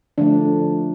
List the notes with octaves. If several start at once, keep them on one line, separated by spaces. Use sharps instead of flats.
D3 F3 A3 D4